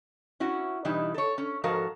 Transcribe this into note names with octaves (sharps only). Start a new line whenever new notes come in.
C#4 E4 F#4
B2 E3 G3 D#4 E4
A4 C#5
C#4
G#2 F3 F#4 A4 A#4 F5